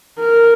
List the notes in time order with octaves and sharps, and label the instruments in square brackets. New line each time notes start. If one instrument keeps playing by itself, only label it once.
[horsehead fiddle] A#4